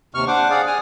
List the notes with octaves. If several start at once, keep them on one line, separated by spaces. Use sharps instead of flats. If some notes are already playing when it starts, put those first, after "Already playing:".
D#2 C3 C#6 F6
D4 C5 F#5 D6
G#4 D5 F5 F#5
G#5 D#6 F6